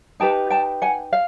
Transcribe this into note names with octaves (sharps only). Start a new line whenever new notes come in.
D#4 G4 B4 G5 A5
G5 A5
F#5 G#5
F5